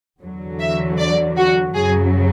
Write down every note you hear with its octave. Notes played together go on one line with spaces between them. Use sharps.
E2 D3 F#3
E5
D5
F#4
F#2 C#3 F#3 G#4